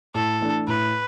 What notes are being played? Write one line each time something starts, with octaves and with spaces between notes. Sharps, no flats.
A2 A4
E3 A3 D4
A2 B4